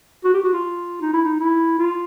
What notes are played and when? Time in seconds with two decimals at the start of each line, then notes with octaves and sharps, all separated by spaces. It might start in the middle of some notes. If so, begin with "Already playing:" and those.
0.25 F#4
0.34 G4
0.44 F#4
0.53 F4
1.01 D#4
1.13 E4
1.25 D#4
1.40 E4
1.79 F4